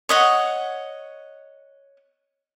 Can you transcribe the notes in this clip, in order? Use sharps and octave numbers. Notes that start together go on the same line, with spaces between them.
C#5 D#5 F#5